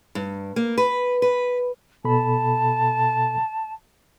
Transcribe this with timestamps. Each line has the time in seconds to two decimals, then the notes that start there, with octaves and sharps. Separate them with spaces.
0.15 G2
0.56 A#3
0.78 B4
1.22 B4
2.05 B2 A4 A5 B5